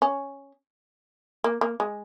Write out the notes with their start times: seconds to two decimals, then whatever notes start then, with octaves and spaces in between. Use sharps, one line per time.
0.02 C#4
1.44 A#3
1.61 A#3
1.80 G#3